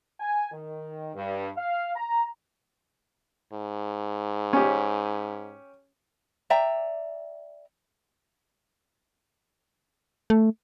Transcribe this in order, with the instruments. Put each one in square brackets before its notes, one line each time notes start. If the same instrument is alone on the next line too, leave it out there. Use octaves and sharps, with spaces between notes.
[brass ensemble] G#5
D#3
G2
F5
A#5
[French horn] G#2
[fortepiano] C#4 G4
[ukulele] D5 E5 G5 A#5
[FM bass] A3